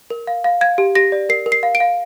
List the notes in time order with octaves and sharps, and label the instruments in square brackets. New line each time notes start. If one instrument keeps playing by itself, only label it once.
[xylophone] A#4
F5
F5
F5 G#6
G4
G4 A#6
D5
A#4 C7
A#4
C7
F5
D7
F5